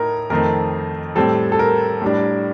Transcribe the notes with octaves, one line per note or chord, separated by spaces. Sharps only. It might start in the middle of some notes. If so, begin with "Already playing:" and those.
Already playing: A2 A3 D#4 A#4
F2 D#3 A3 C4 A#4
A2 G3 C4 A4
A4
A#4
A2 G3 D4